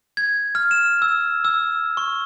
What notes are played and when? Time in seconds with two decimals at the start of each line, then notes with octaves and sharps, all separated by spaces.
0.17 G#6
0.55 F6
0.71 E7
1.02 E6
1.45 E6
1.97 C#6